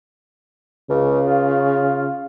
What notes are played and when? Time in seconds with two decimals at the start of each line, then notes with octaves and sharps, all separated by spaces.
0.89 C#2 C#3
1.28 F4